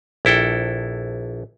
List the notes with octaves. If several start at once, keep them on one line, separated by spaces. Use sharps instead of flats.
A#1 E4 A4 G5